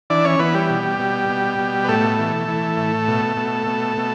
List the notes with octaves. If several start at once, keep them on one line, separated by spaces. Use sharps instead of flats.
E3 D4 D5
C#4 C#5
E3 B3 B4
G3 G4
B2
B2
B2
B2
B4
A2 A3 A4
E3
E3
A2
B2
B2
B2
B2